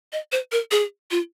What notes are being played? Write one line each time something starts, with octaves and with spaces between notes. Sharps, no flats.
D#5
C5
A#4
G#4
F4